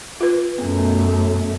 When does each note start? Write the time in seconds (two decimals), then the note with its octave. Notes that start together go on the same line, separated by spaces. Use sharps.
0.20 F4 B4
0.58 F#2 B2 A3 B3